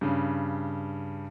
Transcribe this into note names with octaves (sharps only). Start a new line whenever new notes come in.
G2 C#3